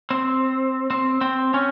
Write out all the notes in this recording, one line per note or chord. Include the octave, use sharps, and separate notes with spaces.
C4
C4
C4
C#4